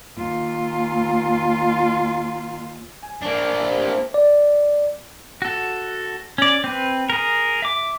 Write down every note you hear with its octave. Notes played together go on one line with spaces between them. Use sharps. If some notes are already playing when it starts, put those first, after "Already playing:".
D#2 F4
G#5
A#3 D4
C3 E4
C3 G4
D5
F#4 A4
C#4 D5
C4 B4
G#4 A#4
E5 D6